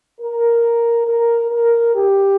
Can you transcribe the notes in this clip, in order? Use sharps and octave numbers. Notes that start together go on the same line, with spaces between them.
A#4
A#4
A#4
G4